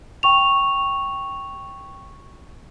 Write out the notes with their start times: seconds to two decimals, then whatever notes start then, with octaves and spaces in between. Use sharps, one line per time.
0.23 G5 C#6 F7